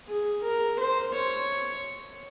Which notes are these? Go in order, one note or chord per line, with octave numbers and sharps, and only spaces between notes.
G#4
A#4
C5
C#5